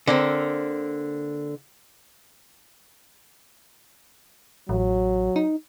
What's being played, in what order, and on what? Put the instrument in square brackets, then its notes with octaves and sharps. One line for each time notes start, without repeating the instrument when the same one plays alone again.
[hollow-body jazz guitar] D3 A#3 C4
[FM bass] A1 [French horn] F#3
[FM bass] D#4